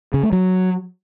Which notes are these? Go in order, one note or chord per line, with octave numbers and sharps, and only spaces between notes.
C#3
A3
F#3